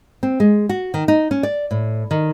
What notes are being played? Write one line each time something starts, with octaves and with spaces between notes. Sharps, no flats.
C4
G#3
F#4
D#3
D#4
C#4
D5
A2
D#3